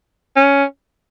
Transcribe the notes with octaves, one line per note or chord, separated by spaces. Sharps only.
C#4